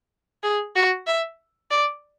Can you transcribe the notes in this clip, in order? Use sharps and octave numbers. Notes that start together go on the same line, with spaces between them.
G#4
F#4
E5
D5